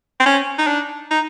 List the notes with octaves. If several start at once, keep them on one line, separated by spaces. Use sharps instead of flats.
C4
C#4
D#4
D4
D#4